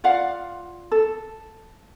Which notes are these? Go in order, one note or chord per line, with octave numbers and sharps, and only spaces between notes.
F4 D5 F5 F#5
A4